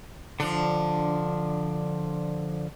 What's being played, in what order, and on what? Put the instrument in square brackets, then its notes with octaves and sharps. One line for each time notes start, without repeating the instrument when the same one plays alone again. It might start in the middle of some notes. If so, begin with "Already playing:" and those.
[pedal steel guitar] D3 F3 [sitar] D4